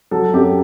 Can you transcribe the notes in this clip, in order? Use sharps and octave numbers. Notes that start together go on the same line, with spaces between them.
F#3 A4
F#2 G4